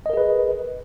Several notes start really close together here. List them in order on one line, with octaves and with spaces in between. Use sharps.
D#5 A#4 G#4 B4